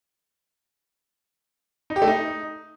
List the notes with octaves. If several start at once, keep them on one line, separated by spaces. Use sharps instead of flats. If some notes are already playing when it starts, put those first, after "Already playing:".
D#4
G4
A3
D#4